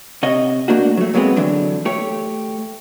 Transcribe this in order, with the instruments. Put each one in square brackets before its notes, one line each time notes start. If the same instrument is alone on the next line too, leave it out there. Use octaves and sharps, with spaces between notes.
[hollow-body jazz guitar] C3 C#5 D#5
A3 A#3 D4 F#4
F#3 A3
A#2 F#3 G#3 B3 C4
D3 E3 F#3 D4
A3 G4 C#5